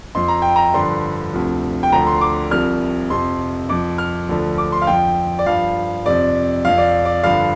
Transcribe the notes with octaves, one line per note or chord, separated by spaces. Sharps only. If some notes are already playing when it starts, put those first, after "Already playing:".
F2 F3 C6
A#5
G5
A#5
G2 D3 F3 C6
D2 C3 F3
G5
D2 D3 F3 A#5
C6
D6
C2 C3 F3 F6
F2 C3 F3 C6
F2 F3 D6
F6
D2 D3 F3
D6
C6
F5
F2 F3 G5
D5
G2 F3 F5
F2 C3 F3 D5
F2 F3 F5
D5
D5
G2 D3 F3 F5